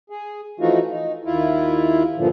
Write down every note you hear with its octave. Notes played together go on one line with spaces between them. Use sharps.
G#4
E3 F3 A3 D#4 F4 F#4
D#4
D#2 E4 F4
G2 A#2 D3 F3